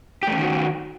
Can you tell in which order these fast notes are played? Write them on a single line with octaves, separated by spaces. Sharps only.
G4 A3 C#4 D#3 F#4